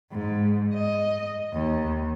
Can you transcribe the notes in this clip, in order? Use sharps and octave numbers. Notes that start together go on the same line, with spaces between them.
G#2
D#5
D#2